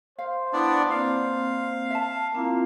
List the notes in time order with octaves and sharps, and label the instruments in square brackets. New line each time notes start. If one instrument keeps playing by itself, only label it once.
[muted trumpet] C5 [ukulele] F5
[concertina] B3 D4 D5 [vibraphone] E4
[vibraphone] A#3 C4 [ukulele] D5 [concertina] F5
[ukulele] E5 A5
[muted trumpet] A#3 [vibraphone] C4 E4 F4